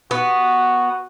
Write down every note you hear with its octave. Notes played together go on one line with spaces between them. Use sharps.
B3 F#4